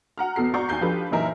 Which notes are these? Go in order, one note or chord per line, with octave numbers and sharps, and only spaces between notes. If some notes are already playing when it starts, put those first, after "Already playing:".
F#5 A#5 F6
E2 B2 A4 C7
D5 F#5 A#5 C#6 G6
D#2 G#5 G6 C7
F3 D4 F4 G4 A4 B4
F#1 A#2 E3 D#4 A#4 E5